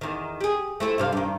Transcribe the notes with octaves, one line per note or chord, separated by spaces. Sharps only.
E2 D#3
G4 G#4
A3 C4 E4
G2 C3 F5
G2 D#3